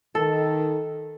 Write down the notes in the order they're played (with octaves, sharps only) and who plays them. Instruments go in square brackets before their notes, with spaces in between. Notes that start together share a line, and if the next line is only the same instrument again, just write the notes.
[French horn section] D#3 [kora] A4